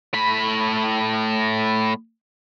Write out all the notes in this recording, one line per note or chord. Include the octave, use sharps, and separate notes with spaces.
A2 B5